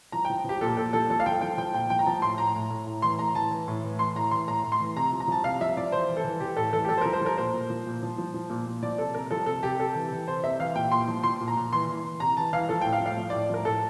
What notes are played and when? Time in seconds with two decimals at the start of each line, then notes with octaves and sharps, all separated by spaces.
0.12 F3 A#5
0.25 F3 G5
0.45 F3 G4
0.61 A#2 A4
0.77 A#2 A4
0.93 F3 A4
1.10 F3 A4
1.20 F5
1.26 F3 G5
1.41 F3 G5
1.58 F3 G5
1.74 A#2 G5
1.90 F3 G5
1.99 A#5
2.06 F3 A5
2.22 A2 C6
2.38 A2 A#5
2.55 A2
2.70 A2
2.87 A2
3.02 E3 C6
3.19 A2 A#5
3.35 E3 A5
3.51 E3
3.68 A2
3.84 E3
3.99 E3 C6
4.15 A2 A#5
4.31 E3 C6
4.47 A2 A#5
4.63 A2
4.72 C6
4.80 E3
4.96 C3 A#5
5.12 F3
5.20 A#5
5.28 F3 A5
5.44 C3 F5
5.61 F3 E5
5.77 F3 D5
5.92 E3 C5
6.09 E3
6.17 A4
6.24 E3
6.40 E3 G4
6.57 A2 A4
6.73 E3 A4
6.85 G4
6.89 F3 A4
6.97 C5
7.01 F3 A#4
7.13 C5
7.21 F3 A#4
7.37 A#2 C5
7.53 A#2
7.70 F3
7.86 A#2
8.03 F3
8.18 F3
8.34 F3
8.50 A#2
8.66 A#2
8.82 F3 D5
8.98 C3 A4
9.14 C3 A#4
9.31 F3 A4
9.46 C3 A4
9.63 C3 G4
9.79 C3 A4
9.95 E3
10.12 E3
10.27 C3 C5
10.44 C3 E5
10.59 E3 F5
10.75 A#2 G5
10.92 A#2 C6
11.08 F3
11.23 F3 C6
11.40 A#2
11.48 A#5
11.56 A#2
11.73 E3 C6
11.88 E3
12.04 E3
12.20 C3 A#5
12.37 E3 A5
12.53 E3 F5
12.69 F3 A4
12.81 A2 G5
12.93 F5
13.01 F3
13.06 F5
13.17 F3
13.30 A2 D5
13.50 F3 A#4
13.65 A2 A4